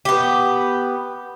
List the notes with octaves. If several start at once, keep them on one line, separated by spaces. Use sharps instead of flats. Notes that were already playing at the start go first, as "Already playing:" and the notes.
B3 G4